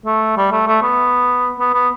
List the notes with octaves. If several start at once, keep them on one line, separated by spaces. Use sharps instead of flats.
A3
G3
A3
A3
B3
B3
B3